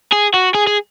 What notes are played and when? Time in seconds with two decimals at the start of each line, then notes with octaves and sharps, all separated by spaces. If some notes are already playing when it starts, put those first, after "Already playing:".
0.13 G#4
0.34 F#4
0.54 G#4
0.67 G#4